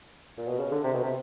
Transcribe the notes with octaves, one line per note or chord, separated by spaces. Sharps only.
A#2
B2
C#3
D3
C3
B2
C3